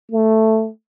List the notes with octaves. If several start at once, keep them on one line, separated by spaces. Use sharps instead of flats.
A3